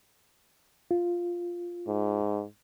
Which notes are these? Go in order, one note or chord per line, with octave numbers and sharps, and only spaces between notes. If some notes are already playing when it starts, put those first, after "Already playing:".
F4
G#2